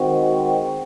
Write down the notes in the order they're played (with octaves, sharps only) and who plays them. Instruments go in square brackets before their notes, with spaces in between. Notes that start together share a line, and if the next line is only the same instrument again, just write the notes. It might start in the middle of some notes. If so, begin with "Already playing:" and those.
Already playing: [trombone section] D#3 G#3 C4 F#4